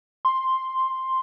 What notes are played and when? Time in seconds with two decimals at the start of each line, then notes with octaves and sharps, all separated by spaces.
0.25 C6